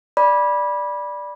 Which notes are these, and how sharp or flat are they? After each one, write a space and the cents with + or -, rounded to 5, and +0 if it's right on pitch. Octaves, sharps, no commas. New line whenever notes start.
D5 +0 B5 -20